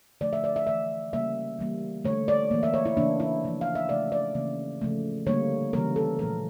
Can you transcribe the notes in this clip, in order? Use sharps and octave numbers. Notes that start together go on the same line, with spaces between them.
D3 F3 A3 D5
E5
D5
E5
E3 A3 E5
C#3 G3 A#3 E5
E3 G3 A#3
D3 A3 C#5
D5
E3 A#3
E5
C#5
E4
C#3 E3 A#3 D4
E4
C#3 F3 A#3
F5
E5
C#3 F3 A3 D5
D5
C#3 E3 A#3
C#3 F3 A3
D3 G3 A#3 C#5
C#3 E3 G3 A#3 A#4
A4
A#2 F3 A3 A#4